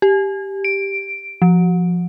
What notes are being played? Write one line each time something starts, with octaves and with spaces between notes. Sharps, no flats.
G4
D7
F3